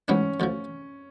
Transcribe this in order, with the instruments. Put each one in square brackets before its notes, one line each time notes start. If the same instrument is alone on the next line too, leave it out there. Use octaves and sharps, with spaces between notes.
[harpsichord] A1 G#2 G#3 B3 D4 [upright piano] C#4
[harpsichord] D2 D3 F3